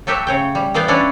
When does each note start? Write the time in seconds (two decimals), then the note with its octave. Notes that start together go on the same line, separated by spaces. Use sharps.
0.07 F#3 A3 F#4 G4 E5 G5
0.27 C#3 C#5 G5
0.55 G3
0.74 E3 B3 D5 F5 G5
0.88 C#4 D4 E4 B4 C#5 D5